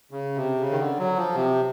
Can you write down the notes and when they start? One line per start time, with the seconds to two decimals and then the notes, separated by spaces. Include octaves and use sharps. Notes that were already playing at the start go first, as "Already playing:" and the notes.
0.11 C#3
0.36 C3
0.60 C#3
0.71 D#3
0.79 D3
0.98 F#3
1.16 F3
1.35 C3